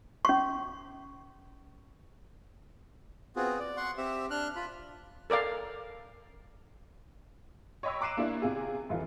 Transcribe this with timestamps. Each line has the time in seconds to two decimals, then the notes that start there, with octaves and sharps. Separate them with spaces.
0.25 C#4 C#6
3.36 B3 C4 F4 F#4 G#4
3.59 D5
3.77 F#5 C6 C#6
3.97 C4 G4 E5
4.30 D4 F6 F#6
4.56 F4 B5
5.30 A4 A#4 D5 F5
7.83 C#5 D#5 G5 B5 D6 E6
8.01 A#5 D6 F#6 C7 D#7 E7
8.17 A#3 D4 E4
8.42 C3 F4 G#4
8.89 F1 E3 F4